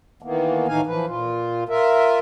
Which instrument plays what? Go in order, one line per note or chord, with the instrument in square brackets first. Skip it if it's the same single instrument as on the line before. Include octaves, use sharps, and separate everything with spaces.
[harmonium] D#3 E3 A#3 B3
A2 D#3 E3 D#4 F5 G#5
E3 F3 B4
A#2 F4
F4 A#4 E5